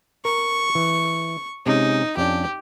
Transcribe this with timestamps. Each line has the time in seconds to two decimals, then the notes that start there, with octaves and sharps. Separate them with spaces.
0.25 A#4 C#6
0.75 E3
1.66 C3 G#3 C#4 D#4
2.17 F2 C#4 D4 G4